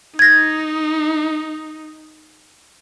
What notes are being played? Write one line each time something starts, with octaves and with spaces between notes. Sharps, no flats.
D#4 G#6 A#6